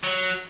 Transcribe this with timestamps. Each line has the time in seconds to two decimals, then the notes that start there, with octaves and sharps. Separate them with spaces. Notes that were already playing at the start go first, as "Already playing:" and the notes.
0.04 F#3